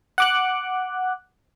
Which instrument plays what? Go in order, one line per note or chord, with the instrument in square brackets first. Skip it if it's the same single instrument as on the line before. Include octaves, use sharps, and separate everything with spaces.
[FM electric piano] F#5 D6 F#6